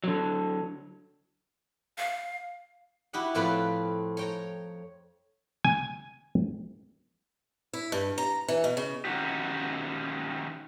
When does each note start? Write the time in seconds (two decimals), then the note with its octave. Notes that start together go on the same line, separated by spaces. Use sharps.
0.04 D3 F#3
1.98 F5
3.13 E4 F#4 G4 D#5 F#5
3.35 F2 A2 C4 F4 B4 F#5
4.17 C#5 G5 A#5
5.65 G#5
7.73 E4
7.92 G2
8.18 A#5
8.48 E3
8.64 B2
8.77 C#3
9.05 D#3 C#4 D#4 F#4 G4